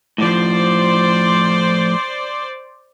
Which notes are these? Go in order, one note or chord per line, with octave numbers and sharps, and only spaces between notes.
A2 F3 C5 D5